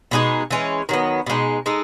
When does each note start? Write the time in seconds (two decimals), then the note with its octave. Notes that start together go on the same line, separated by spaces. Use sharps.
0.11 B2 G#3 D#4 G#4
0.51 E3 G#3 C#4
0.89 D#3 F#3 B3
1.26 B2 G#3 D#4
1.66 G#3 D#4 A4